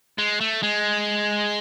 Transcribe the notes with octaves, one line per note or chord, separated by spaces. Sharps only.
G#3
A3
G#3